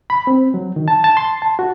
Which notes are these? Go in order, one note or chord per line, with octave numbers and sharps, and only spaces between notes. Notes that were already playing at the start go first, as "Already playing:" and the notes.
B5
C4
F#3
D#3
A5
A5
C6
A5
F#4